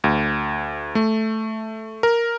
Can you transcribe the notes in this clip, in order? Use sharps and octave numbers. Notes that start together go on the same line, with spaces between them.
D2
A3
A#4